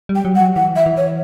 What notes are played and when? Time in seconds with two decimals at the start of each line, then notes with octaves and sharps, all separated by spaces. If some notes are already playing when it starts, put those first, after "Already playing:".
0.09 G3
0.15 G5
0.25 F#3
0.34 G3 F#5
0.41 F#3
0.56 E3 F#5
0.76 E5
0.86 E3
0.97 C#5